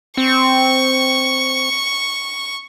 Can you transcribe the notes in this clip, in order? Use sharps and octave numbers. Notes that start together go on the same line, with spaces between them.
C4 C#6